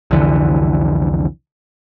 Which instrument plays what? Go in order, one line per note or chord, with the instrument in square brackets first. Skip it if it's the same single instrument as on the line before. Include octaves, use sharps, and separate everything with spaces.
[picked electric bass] C2 F2 D3 E3